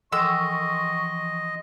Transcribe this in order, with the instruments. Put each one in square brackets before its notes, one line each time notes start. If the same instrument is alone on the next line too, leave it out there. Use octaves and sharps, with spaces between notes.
[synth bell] E3 F3 C6 [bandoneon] D#5 [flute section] C#6 [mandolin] E6